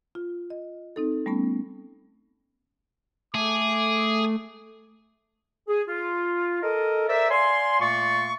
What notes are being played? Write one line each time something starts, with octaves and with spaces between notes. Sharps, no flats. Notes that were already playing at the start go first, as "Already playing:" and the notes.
F4
D#5
C4 D#4 A4
G3 A3 B3 C#4
A3 G#4 D6
G#4
F4
A4 A#4 D#5
A#4 C5 D5 E5
D5 F5 G#5 C6
A#2 A3 A#3 D5 C6 C#6